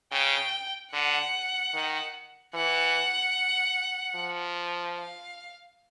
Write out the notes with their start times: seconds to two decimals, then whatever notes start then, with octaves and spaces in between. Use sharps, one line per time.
0.12 C#3 G5
0.92 D3 F#5
1.74 D#3
2.54 E3 F#5
4.16 F3
4.97 F5